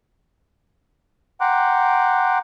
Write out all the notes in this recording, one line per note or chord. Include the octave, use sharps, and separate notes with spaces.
F#5 G5 A#5 C6 D6 F#6